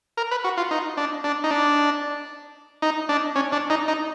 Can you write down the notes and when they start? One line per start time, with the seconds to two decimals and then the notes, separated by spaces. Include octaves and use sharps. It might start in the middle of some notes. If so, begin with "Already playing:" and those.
0.17 A#4
0.31 B4
0.44 F#4
0.57 F4
0.71 D#4
0.97 D4
1.24 D4
1.44 D#4
1.51 D4
2.82 D#4
3.09 D4
3.36 C#4
3.52 D4
3.70 D#4
3.88 D#4